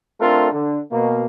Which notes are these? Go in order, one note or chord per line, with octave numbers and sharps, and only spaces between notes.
A3 C4 D4 F4 A4 A#4
D3
B2 A#3